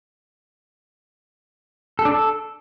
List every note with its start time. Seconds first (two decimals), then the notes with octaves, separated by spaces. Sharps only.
1.99 A4
2.05 D4
2.12 A4